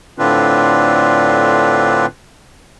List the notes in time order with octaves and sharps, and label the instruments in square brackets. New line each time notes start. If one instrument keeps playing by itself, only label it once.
[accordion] A2 D3 C4 D4 F4 B4